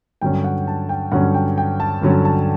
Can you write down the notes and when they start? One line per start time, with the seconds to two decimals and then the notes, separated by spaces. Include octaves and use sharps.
0.21 G2 D3 F#3 C#4 G5
0.44 F#5
0.67 A5
0.89 G5
1.12 G2 D3 F#3 C#4 F#5
1.34 G5
1.58 G5
1.80 A5
2.02 G2 D3 F#3 C#4
2.25 A5